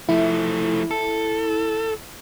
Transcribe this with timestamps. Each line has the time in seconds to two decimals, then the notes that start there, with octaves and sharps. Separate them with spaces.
0.09 F3 A3 E4
0.91 A4